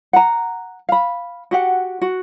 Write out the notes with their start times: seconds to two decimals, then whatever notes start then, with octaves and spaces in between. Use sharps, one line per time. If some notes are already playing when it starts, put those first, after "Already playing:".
0.13 F#5 A#5
0.89 F5 B5
1.51 F#4 G4 F#5
2.02 F#4